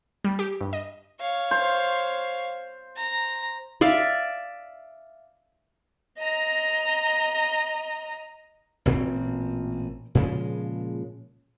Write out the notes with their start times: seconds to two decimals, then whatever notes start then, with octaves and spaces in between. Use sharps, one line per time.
0.24 G3
0.39 G4
0.61 G2
0.73 D#5
1.20 C#5 F5
1.51 C5
2.96 A#5
3.81 D5 E5 F5
6.18 D#5 A#5
8.86 A1 A#2 C4
10.15 A#2 C#3 F3 G#3